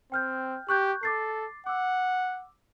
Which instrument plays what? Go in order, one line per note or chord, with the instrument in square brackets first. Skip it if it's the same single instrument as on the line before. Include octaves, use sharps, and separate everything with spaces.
[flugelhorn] C4 [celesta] G5 F6 G6
[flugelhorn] G4 [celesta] C#6 F#6 G6
[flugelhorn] A4 [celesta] D6 A6 C7
[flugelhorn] F#5 [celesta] D6 E6